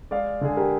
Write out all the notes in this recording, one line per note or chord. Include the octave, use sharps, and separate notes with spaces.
G#3 D5 F5
D3 G#4
G4 A#4